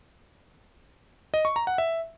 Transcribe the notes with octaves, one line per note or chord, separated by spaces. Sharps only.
D#5
C#6
A#5
F#5
E5